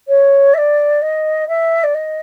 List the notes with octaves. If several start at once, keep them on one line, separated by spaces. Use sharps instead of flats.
C#5
E5
D5
D#5
E5
D5
D#5